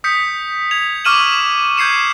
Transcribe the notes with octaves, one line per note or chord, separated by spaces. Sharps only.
D#6 G6 B6 C#7
G#6 F7
C#6 D6 F6 D#7 E7 F#7
G6 G#6 C7 C#7 E7